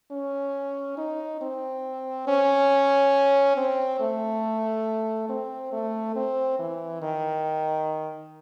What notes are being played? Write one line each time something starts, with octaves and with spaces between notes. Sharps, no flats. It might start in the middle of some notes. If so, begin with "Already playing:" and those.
C#4
D#4
C4
C#4
C4
A3
C4
A3
C4
E3
D#3